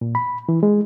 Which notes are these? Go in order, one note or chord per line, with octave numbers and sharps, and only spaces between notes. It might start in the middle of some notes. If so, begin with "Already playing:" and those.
A#2
B5
E3
G#3